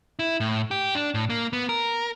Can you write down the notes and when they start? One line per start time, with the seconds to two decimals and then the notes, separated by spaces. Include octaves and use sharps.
0.19 E4
0.40 A2
0.71 G4
0.95 D4
1.14 A2
1.30 A#3
1.53 B3
1.69 A#4